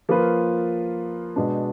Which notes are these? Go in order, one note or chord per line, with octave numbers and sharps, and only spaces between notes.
F3 A#3 F4 B4
B2 G#3 B3 D4